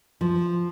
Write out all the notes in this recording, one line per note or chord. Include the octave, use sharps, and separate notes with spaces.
F3